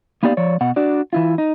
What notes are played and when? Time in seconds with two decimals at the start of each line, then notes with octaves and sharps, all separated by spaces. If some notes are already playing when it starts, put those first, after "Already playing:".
0.23 A#3 B3 D#4 G4 D5 F5
0.37 F3 C#5 D5
0.61 B2 F#5
0.76 D4 F#4 D5
1.13 E3 E4 F4
1.38 D#4